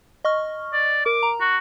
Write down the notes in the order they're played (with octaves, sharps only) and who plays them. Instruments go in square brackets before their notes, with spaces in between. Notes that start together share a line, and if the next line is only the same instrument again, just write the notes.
[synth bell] D#5 C#6 F6
[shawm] D5
[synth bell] A#4 [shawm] D6
[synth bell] A#5
[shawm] F#4